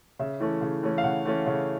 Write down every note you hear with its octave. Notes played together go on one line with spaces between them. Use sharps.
C#3 E5
E3 A3 C#4
C#3
E3 A3 C#4
F5
C#3 F#5
E3 A3 C#4
C#3